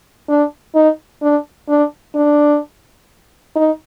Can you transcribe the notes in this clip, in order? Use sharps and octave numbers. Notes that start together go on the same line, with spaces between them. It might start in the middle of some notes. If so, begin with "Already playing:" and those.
D4
D#4
D4
D4
D4
D#4